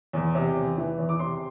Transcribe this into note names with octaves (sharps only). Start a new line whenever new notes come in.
E2
C3
E2
E3
E2
D6
C3 C6